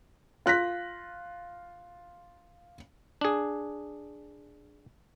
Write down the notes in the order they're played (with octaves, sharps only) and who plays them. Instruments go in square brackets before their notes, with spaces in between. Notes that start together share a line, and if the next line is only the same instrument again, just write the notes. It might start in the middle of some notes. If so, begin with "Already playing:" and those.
[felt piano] F4 F#6 A#6 B6
[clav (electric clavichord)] D4 G#4